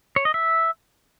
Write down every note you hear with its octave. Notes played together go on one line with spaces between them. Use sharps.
C#5
D#5
E5